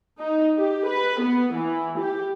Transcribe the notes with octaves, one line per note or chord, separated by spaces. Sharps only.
D#4
G4
B4
B3
E3
G4